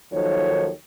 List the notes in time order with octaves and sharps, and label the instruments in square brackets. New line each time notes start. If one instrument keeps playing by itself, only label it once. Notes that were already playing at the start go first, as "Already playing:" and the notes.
[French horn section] D#2 D#3 F3 F#3 A4 C#5